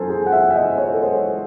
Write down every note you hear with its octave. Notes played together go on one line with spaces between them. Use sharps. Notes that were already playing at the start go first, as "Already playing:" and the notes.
Already playing: F#2 A4 C5 G#5
G#4
F#5
E5
E5
D#5
C#5
A4
C5